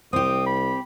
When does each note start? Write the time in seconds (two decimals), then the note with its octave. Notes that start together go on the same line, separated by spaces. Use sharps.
0.13 C2 C4 G4 D#6
0.46 B5